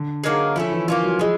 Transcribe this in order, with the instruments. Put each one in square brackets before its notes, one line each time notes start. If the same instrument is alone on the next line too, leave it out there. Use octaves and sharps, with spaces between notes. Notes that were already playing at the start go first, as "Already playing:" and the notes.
Already playing: [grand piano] D3
[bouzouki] F#3 A#3 D#4 G#4
[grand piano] F3 [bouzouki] A3 C#4 E4
[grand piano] E3
[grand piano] F3 [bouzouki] A#3 C#4 F4
[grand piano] F#3
[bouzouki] E3 G#3 [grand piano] F3